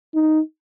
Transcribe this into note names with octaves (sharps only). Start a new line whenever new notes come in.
D#4